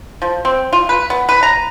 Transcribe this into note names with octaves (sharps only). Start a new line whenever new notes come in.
F3
C4
F4
B4
B3
B4
A#5